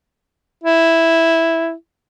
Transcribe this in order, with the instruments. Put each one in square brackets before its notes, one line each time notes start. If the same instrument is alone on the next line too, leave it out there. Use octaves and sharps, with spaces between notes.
[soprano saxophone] E4